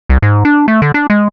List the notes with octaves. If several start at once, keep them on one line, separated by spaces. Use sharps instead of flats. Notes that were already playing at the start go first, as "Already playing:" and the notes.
C2
G#2
D4
A3
D3
D4
G#3